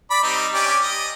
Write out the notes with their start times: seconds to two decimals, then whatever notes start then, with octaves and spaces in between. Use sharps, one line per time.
0.11 D5 B5
0.23 G3 C4 D#4
0.54 C#4 G4 D5
0.83 D#5